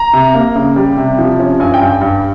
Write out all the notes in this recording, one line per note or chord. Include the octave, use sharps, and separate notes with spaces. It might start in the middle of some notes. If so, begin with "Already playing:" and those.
Already playing: A#5
C3
A#3
C#3
G3
C3
F3
C#4
G2 G#5
G5
G2
G5
G2